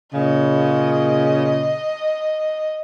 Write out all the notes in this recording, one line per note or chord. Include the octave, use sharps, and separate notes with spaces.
A#2 C#3 D#5